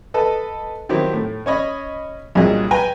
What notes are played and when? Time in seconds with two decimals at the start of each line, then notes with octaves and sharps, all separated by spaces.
0.14 A4 B4 D#5
0.89 D#3 F#3 C4 E4 G4
1.13 A2
1.46 C#4 C#5 D#5 B5
2.35 C2 G2 A#2 F#3 G#4 D#5
2.71 B4 G5 G#5 A#5